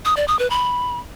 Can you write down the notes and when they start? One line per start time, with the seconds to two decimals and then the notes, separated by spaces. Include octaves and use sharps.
0.05 D#6
0.17 D5
0.28 D#6
0.39 B4
0.50 B5